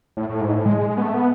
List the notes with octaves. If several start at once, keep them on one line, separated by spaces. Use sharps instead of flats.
A2
A2
G#2
A2
G#3
G#3
G#3
B3
A3
B3